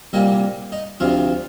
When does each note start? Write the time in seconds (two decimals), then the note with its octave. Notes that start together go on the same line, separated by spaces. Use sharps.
0.13 C2 A#2 G3 A#3 D#5
0.72 D#4
1.00 D2 C3 F3 F4